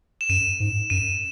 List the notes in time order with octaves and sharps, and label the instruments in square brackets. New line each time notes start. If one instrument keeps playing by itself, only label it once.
[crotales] E7
[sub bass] F#2 [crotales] D#7
[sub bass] G#2
[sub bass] F#2 [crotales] D#7